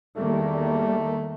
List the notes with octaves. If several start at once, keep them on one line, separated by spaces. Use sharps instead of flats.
E2 D#3 G3 A3 A#3